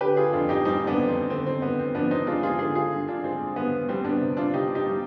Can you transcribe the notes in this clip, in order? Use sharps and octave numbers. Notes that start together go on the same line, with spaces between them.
D3 G4 B4
F4 G#4
F2 D4 F4
D#4 G4
G3 C4 D#4
B3 D4
F2
C4
D3 C4
C4
G2 B3
C4
F3 B3 D4
C4 D#4
G#3 D4 F4
F4 G#4
D3 F4 G#4
F4 G#4
G2
D4 F4
G#3 C4
G2 B3
G3 C4
B3 D4
C3
D4 F4
C3 D#4 G4
D#4 G4
G3